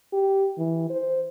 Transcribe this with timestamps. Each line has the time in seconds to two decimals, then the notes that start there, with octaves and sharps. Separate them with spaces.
0.13 G4
0.58 E3
0.90 C5